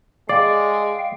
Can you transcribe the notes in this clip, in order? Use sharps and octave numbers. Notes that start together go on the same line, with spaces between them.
G#3 D5 F5 G5